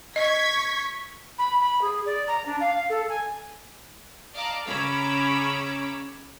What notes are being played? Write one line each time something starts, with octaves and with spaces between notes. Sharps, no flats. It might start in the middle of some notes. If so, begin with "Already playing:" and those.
D#5 C#6 G#6 B6
B5
B5
G#4
D5
A#5
D4
F5
A4
G#5
D5 D#5 F5 A5 A#5 D6
C#3 C#4 A#5 B5 D6 E6